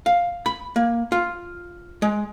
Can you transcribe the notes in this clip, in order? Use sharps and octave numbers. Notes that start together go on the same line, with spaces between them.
F5
B5
A#3
F4
G#3